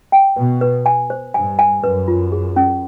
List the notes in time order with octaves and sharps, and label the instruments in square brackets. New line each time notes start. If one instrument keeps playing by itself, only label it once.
[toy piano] G5
[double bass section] B2 [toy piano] B4
[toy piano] B4
G#5
C5
[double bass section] G2 [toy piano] G#5
[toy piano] G#5
[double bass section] F#2 [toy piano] B4
[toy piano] F4
G#4
C#4